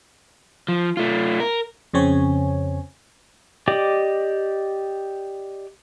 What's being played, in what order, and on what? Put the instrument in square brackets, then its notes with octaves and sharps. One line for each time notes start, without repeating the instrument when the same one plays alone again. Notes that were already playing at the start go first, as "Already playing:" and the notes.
[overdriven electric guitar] F3
A3 F4
A#4
[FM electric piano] F2 C#3 C4 C#5 G#5
[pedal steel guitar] G4 D5 D#5 D6